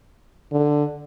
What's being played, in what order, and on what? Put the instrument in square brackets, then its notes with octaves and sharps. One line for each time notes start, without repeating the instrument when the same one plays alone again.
[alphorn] D3